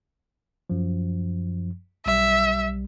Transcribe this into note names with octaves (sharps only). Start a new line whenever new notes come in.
F#2 F3
B1 G3 E5